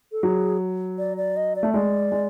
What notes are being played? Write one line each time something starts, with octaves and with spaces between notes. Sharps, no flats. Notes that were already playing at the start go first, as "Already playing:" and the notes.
A4
F#3 G#4
D5
D5
D#5
D5
A3
G#3 D5
G#3